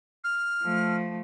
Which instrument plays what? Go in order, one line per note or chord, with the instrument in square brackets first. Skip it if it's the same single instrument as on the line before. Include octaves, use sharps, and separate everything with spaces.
[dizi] F6
[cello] F3 A3